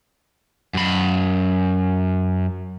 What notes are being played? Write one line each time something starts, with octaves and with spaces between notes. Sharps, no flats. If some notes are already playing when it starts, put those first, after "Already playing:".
F#2 B5